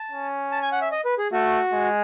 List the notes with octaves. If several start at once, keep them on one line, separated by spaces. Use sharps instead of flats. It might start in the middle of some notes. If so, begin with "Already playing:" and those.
Already playing: A5
C#4
A5
G#5
F#5
E5
D#5
B4
G#4
A3 F#4
G#3